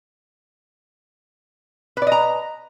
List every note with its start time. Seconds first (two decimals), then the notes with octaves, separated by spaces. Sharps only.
1.97 B4
2.02 D5
2.07 D#5
2.12 A#5